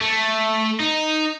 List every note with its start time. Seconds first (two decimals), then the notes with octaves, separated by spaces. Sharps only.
0.01 A3
0.80 D#4